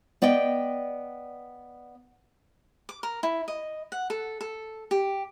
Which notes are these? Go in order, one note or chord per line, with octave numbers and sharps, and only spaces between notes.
B3 D5 D#5 G5
D6
A#4
E4
D#5
F#5
A4
A4
G4